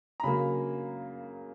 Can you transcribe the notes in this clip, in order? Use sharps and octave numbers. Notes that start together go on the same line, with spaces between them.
A#5
C#3 F#3 A#3 B5